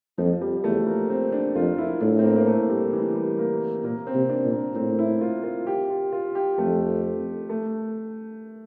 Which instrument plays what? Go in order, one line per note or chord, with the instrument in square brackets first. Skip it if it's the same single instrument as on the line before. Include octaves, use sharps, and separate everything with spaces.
[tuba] F2 [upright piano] F3
[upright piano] G3
[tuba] E2 [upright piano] A3
[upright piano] A#3
C4
D4
[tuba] F2 [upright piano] F4
[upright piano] E4
[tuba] A2 [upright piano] D4
[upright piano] C4
A#3
A#3
A3
G3
E3
G3
A#3
[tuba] A#2 [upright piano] A#3
[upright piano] C4
[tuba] C3
[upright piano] D4
[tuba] A#2
[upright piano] A#3
[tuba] A2 [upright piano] C4
[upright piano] E4
F4
F4
G4
F4
F4
G4
[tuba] F2 [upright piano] A3
[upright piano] A3